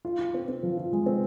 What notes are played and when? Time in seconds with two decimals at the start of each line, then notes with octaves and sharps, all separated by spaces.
0.05 F4
0.19 F4
0.34 C4
0.48 C4
0.63 F3
0.77 F4
0.92 G#3
1.06 C4